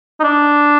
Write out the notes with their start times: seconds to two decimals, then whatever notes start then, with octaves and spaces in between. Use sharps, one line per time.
0.20 D#4
0.24 D4